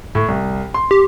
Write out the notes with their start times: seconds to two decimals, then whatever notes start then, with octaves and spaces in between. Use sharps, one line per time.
0.15 A2
0.28 C2
0.74 C6
0.91 G4